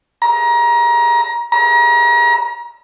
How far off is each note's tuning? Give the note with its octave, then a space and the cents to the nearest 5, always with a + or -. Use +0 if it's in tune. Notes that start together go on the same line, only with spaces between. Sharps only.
A#5 +25
A#5 +35